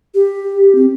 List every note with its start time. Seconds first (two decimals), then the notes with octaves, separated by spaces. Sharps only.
0.15 G4
0.75 C4